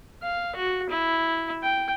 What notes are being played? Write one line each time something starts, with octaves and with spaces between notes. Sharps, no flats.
F5
F#4
E4
G5